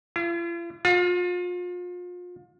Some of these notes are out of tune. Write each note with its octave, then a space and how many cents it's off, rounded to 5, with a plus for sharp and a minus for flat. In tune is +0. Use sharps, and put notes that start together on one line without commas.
F4 -45
F4 +35